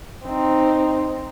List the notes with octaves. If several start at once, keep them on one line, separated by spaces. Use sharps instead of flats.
C4 D#4